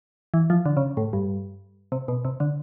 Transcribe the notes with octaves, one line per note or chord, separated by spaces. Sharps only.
E3
F3
D3
C#3
A2
G2
C3
B2
C3
D3